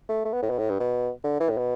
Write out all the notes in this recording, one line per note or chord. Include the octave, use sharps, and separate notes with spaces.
A3
A3
B3
A2
B2
A2
G2
B2
D3
E3
A2
B2